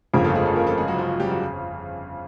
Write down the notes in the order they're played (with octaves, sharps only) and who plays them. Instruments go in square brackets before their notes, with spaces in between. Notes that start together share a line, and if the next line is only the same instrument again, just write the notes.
[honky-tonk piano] G1 F2 C#3 [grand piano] A#3 A#4
[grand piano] A3 A4
G#3 G#4
A3 A4
A#3 A#4
A3 A4
G#3 G#4
F#3 F#4
F3 F4
G3 G4
F#3 F#4